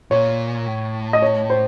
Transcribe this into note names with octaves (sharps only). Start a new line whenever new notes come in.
A#2 C#5
A2
D#5
C#5
C5